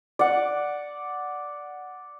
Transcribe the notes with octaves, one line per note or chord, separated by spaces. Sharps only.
D5 F#5